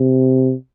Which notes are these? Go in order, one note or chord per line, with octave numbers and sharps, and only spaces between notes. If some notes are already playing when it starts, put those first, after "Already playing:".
Already playing: C3